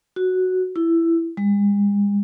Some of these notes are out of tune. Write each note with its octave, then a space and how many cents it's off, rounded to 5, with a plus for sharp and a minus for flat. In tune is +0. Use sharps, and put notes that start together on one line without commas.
F#4 +0
E4 +15
G#3 -45